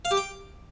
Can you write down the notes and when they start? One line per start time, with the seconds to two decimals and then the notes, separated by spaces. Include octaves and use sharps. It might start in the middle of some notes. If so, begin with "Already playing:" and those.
0.05 F5
0.11 G4
0.17 G5